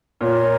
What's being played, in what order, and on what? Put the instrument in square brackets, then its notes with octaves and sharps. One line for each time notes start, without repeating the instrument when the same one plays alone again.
[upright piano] A#2 [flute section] F4 A#4 C#5